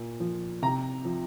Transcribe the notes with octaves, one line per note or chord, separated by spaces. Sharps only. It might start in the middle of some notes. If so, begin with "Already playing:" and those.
Already playing: A#2
F3
C3 A#5
F3